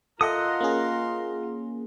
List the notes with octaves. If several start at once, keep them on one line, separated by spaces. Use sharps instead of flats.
F4 A4 A#4 D#5 E5 F#5 C6 D#6
A#3 C#4 G#4